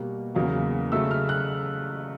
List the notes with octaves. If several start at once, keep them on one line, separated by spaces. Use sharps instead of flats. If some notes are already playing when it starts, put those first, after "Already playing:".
Already playing: B2 G3 A#3
E2 C#3 F#3 A#3
C#3 F#3 A3 E6
F6
F#6